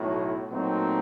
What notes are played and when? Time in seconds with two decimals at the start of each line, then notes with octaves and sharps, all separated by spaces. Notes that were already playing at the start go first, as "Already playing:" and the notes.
Already playing: B1 A2 F#3
0.50 A#2 F#3 A3 C4 D#4